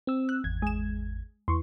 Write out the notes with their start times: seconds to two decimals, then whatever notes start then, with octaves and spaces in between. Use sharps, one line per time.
0.07 C4 E6
0.29 F#6
0.44 G#1 E2 G#6
0.62 G#3 E7
1.48 E2 C6 C#6